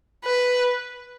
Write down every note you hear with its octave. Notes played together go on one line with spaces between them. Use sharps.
B4